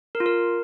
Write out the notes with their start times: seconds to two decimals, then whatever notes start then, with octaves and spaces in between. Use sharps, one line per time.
0.15 A#4
0.20 F4
0.26 A#4